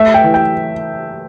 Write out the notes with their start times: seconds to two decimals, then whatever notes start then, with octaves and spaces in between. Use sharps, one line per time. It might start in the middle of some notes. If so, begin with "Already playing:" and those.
Already playing: A3 E5
0.14 G5
0.24 E3
0.34 G5